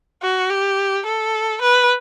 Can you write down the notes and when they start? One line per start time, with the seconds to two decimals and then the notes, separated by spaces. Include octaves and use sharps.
0.22 F#4
0.50 G4
1.06 A4
1.61 B4